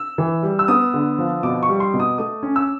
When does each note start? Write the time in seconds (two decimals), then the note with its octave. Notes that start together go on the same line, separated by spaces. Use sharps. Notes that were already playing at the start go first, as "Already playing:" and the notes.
Already playing: E6
0.18 E3
0.43 G3
0.59 E6
0.68 B3 D#6
0.94 D3
1.18 F3
1.43 B2 D6
1.63 C#6
1.69 G3
1.80 C6
1.94 B2
2.00 D#6
2.18 A3 D#6
2.43 C#4
2.56 E6